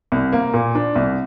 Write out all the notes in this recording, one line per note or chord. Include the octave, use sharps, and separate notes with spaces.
C2
A#3
A#2
D4
C2